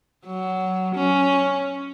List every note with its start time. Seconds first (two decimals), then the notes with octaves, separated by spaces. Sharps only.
0.26 F#3
0.95 C#4